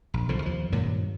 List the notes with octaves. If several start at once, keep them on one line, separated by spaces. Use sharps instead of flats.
A#1
B1 D3 F3
D#2 F3
G2 A#2 D#3 F#3